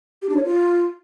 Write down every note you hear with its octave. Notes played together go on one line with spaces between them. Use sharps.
G4
D4
C#5
F4